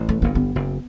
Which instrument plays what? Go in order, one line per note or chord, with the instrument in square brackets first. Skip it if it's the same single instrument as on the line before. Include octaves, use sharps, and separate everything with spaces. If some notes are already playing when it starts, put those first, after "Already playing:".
Already playing: [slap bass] A1 A2
[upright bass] A3
[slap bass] G1 G2 [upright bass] A#3
[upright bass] B3
[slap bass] F#1 F#2